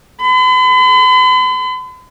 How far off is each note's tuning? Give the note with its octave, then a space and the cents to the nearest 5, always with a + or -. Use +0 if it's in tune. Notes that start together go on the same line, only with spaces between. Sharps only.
B5 +45